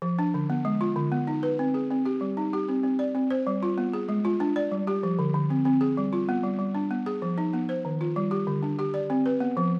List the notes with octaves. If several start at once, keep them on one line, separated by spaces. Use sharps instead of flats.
F3
D4
D3
B3
G#3
F4
D3
B3
D#4
B4
C4
G#4
C4
G4
G3
D#4
G4
C4
C4
D5
C4
C5
G3
F4
B3
G#4
G#3
F4
D4
D5
G3
G4
F3
D3
D3
C4
C4
G#4
G3
F4
B3
G3
G3
D4
B3
G#4
F3
D#4
B3
C5
D#3
F4
G3
G4
D3
D4
G4
D5
C4
B4
B3
F3